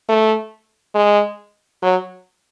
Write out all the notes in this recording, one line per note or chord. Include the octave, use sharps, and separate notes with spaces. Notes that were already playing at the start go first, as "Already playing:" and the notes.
A3
G#3
F#3